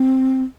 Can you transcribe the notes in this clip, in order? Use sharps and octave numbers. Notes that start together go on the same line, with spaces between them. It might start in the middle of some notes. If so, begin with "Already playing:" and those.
Already playing: C4